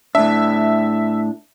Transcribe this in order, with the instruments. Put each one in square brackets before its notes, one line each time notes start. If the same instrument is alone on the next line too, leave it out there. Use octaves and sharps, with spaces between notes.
[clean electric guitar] A2 D4 [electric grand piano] E5